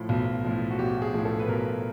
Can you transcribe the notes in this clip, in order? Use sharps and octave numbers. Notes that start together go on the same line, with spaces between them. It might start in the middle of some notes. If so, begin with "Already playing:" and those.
Already playing: A2 F3
B1
A2 F3
F#4
B1 G4
G#4
A2 F3
A4
B4
B1 A#4